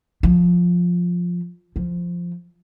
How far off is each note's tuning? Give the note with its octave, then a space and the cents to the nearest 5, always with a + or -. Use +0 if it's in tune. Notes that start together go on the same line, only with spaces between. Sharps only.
F3 +10
F3 -5